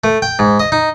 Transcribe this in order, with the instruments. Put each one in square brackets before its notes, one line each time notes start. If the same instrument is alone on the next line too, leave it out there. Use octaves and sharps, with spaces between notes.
[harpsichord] A3
G5
G#2
D#5
D#4